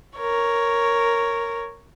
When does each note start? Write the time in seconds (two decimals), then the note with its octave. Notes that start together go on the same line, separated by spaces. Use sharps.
0.17 A#4 C#5